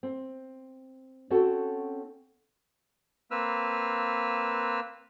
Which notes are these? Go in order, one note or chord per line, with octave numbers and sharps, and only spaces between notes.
C4
C4 C#4 F#4 A4
A#3 C4 B4 E6 F6